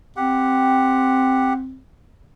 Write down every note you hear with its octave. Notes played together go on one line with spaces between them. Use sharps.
C4 G4 F#5